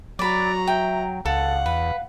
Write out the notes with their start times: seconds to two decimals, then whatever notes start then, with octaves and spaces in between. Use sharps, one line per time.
0.19 F#3 F#4 D5 A#5 B5
0.68 E5 G5
1.25 C#2 A4 F5 F#5
1.66 E2 B4